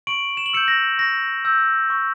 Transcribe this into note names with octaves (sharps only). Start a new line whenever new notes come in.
C#6 D7 F#7
E7
F#7
E6 G6 C#7 E7
A#6
C#6 A#6
E6 G6
C#6